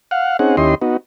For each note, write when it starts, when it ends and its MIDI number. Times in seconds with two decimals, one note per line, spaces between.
0.11 0.37 77
0.11 0.37 78
0.39 0.56 60
0.39 0.56 61
0.39 0.56 63
0.39 0.56 68
0.39 0.56 78
0.57 0.75 39
0.57 0.75 61
0.57 0.75 64
0.57 0.75 67
0.57 0.75 75
0.57 0.75 84
0.82 0.97 59
0.82 0.97 63
0.82 0.97 66